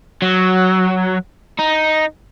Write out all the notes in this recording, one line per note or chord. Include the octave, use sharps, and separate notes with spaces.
F#3
D#4